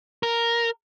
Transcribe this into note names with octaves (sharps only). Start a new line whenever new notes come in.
A#4